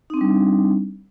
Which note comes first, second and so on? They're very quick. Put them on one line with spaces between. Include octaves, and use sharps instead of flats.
D#4 C4 D4 G3